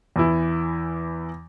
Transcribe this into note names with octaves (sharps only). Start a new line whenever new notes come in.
E2 E3 E4